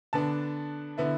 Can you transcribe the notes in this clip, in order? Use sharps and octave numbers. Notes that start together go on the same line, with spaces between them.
D3 B3 D4 A5
D3 B3 E4